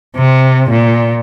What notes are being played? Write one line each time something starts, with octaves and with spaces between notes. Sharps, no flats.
C3
A#2